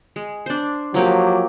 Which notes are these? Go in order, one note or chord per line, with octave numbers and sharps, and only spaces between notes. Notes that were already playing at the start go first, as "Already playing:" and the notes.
G#3
D4 C5
F3 F#3 A#3 G4